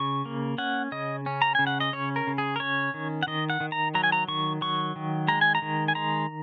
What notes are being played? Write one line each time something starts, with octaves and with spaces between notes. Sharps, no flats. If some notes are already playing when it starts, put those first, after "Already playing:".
Already playing: C#3 C#6
A#3
C#4 F#5
C#3 D#5
C#4
A#5
C#3 G#5
F#5
D#5
C#4 C#5
A#4
C#3
G#4
A#4
C#4 C#5
D#3
F#5
D#3 D#5
F#5
D#3
A#5
F#3 A#5
G#5
A#5
D#3 C#6
F#3 C#6
D#3
G#3 A#5
G#5
A#5
D#3
G#5
G#3 A#5